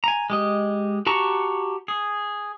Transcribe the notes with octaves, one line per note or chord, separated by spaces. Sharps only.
G#5 A#5
G#3 G4 D#5
F#4 G4 A5 A#5 C#6
G#4